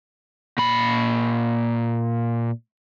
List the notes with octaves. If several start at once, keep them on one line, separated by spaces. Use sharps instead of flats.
A#2 B5